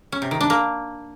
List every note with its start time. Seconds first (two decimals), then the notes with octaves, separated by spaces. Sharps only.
0.12 C#4
0.22 C3
0.31 D#3
0.41 D4
0.50 A#3